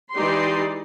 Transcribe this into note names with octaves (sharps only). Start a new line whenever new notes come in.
E3 G#3 D#4 G4 D5 C6